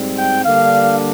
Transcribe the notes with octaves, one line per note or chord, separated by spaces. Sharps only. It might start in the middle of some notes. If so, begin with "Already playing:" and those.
Already playing: G#2 G3 C4
G5
D3 G3 A#3 D4 F5